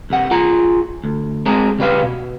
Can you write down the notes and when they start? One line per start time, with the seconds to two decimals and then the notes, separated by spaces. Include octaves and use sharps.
0.10 C2 G2 F#5
0.31 F4 G#4 A#5
1.04 D2
1.46 G#3 C4 G#4 A#5
1.79 C#3 G3 B4 F5
2.03 B2